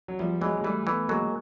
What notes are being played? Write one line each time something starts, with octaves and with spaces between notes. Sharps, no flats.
F#3
E2 F3 G3
E3 F#3 G#3
G#3
E3 G3 A3
E3 A3 B3
F#3 G#3 A#3